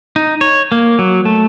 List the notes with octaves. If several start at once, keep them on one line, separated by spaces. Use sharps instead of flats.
D#4
C#5
A#3
F#3
A3